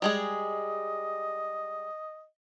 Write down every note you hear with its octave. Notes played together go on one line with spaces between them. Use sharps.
G3 G#3 G#4 D#5